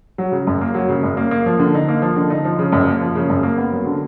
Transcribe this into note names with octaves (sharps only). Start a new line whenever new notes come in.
F#3
C#3
F#2
A#3
F#3
C#3
F#2
A#3
A#3
F3
D3
D#4
A#3
F3
D3
D#4
F3
C#3
F#2
A#3
F3
C#3
F#2
A#3
B3
F#3
D3